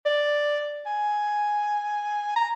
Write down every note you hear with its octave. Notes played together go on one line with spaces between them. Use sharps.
D5
G#5
A#5